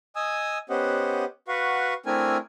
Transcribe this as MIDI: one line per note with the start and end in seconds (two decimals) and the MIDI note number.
0.16 0.58 75
0.16 0.58 80
0.16 0.58 87
0.16 0.58 88
0.70 1.25 59
0.70 1.25 61
0.70 1.25 67
0.70 1.25 72
0.70 1.25 75
0.70 1.25 78
1.48 1.94 66
1.48 1.94 71
1.48 1.94 77
1.48 1.94 78
1.48 1.94 85
2.06 2.37 57
2.06 2.37 60
2.06 2.37 62
2.06 2.37 64
2.06 2.37 70
2.06 2.37 80